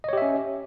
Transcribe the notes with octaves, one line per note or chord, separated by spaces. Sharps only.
C#4 G4 C#5 D#5 E5